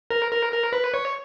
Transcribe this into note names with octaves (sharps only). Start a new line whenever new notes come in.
A#4
A#4
A#4
B4
C#5